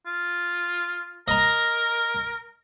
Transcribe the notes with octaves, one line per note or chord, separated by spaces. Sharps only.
F4
A#4 D#5 A#5